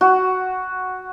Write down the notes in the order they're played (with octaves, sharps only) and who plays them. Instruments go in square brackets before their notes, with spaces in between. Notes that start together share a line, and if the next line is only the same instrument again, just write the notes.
[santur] F#4